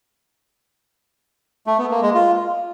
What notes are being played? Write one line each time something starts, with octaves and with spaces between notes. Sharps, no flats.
A3
B3
A#3
G#3
F4